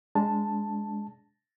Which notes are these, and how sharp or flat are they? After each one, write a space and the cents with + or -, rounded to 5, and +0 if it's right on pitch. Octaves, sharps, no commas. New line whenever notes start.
G#3 +0 D4 -25 A5 +0